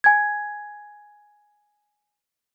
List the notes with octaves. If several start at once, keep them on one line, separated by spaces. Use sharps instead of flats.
G#5 G#6